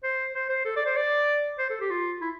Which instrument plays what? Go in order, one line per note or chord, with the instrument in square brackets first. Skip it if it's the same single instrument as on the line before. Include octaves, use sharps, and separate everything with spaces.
[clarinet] C5
C5
C5
A4
D5
C5
D5
C5
A4
G4
F4
E4